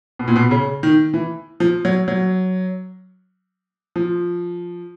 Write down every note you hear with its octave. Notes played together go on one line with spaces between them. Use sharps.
B2
A#2
B2
C#3
D#3
E3
F3
F#3
F#3
F3